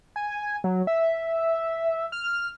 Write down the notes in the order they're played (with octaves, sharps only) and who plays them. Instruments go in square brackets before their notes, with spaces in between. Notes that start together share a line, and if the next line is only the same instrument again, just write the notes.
[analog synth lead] G#5
F#3
E5
F6